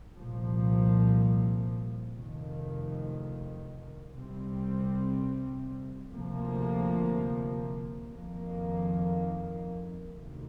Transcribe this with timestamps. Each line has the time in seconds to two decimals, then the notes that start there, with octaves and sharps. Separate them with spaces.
0.16 C2 A#2 F3
2.15 F1 F2 D#3
4.13 C2 C3 G3 C4
6.12 D2 C3 F3 A#3
8.10 F2 D#3 A#3
10.08 D2 C3 D#3